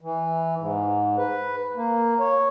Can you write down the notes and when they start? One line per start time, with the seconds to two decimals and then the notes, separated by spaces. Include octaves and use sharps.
0.01 E3
0.58 G#2
1.17 B4
1.76 A#3
2.20 C#5